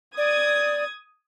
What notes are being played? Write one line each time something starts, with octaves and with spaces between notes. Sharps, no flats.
D5 D#6 G#6